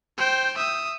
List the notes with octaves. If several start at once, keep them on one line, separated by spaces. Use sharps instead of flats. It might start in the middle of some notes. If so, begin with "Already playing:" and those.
C5 G5
E5 D#6